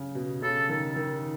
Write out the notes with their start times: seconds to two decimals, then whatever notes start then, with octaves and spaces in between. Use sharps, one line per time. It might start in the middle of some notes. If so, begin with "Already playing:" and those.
Already playing: C#3
0.15 B2
0.42 C#3 A4
0.69 D#3
0.96 D#3